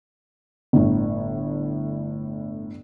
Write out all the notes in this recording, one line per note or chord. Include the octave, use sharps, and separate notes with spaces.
G1 A2